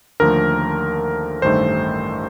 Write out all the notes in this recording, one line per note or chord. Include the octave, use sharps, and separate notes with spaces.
D#2 D3 F3 A3 A#4
A1 G2 D#3 A3 C5